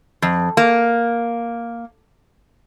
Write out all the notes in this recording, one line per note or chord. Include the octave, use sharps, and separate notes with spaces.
F2
A#3